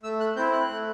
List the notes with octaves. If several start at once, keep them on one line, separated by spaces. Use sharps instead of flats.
A3 E6
F#6
C4 E4 G6
F#6
A3